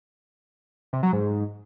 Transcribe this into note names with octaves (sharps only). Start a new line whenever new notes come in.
C3
F#3
G#2